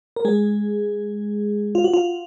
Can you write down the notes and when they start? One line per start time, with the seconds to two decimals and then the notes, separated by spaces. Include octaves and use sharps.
0.16 A#4
0.25 G#3 G#4
1.75 F4
1.84 F#4
1.94 F4